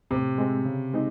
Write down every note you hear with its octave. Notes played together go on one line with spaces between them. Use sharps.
A2 C3
G#3 C4
C#3
G#3 C4 D#4